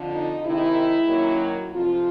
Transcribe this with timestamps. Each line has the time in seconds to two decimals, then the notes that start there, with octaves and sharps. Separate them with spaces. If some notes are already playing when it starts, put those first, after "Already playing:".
Already playing: F2 D3 F3
0.13 D#4
0.44 C3 D#3 G#3 E4
1.08 F#2 D#3 F#3 A#3
1.72 F2 C3 F3 F4